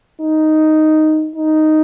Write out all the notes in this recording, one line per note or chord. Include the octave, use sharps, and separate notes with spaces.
D#4
D#4